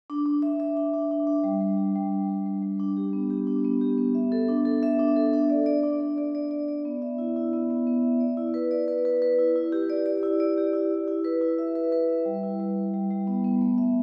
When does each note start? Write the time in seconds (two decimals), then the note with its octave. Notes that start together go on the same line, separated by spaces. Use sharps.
0.10 D4
0.26 D4
0.42 E5
0.60 E5
0.77 D4
0.94 D4
1.11 D4
1.27 D4
1.44 G3
1.61 G3
1.77 G3
1.96 G3
2.12 D4
2.29 G3
2.46 G3
2.62 G3
2.79 D4
2.97 G4
3.13 B3
3.30 G4
3.47 D4
3.64 B3
3.81 G4
3.98 B3
4.15 E5
4.32 A4
4.49 D4
4.65 A4
4.83 E5
4.99 D4
5.16 A4
5.33 D4
5.50 D5
5.66 D5
5.83 D4
6.00 D5
6.18 D5
6.35 D5
6.51 D5
6.68 D5
6.85 B3
7.02 E5
7.18 E4
7.36 E4
7.53 B3
7.70 B3
7.87 B3
8.03 E5
8.20 D5
8.37 E4
8.54 B4
8.71 D5
8.88 B4
9.05 B4
9.22 B4
9.38 E4
9.56 E4
9.72 G4
9.90 D5
10.06 D5
10.23 E4
10.40 D5
10.58 G4
10.73 E4
10.91 E4
11.08 E4
11.25 B4
11.41 E4
11.58 E5
11.75 B4
11.92 B4
12.09 E5
12.25 G3
12.43 E4
12.60 G3
12.77 G3
12.94 G3
13.10 G3
13.27 B3
13.44 B3
13.61 A3
13.78 E5